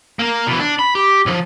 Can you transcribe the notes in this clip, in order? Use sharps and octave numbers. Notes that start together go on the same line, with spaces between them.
A#3 A#4
B2 E3
D4
B5
G4
B1 F3